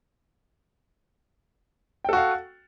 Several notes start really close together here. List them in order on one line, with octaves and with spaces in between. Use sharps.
G5 A4 F#4 F5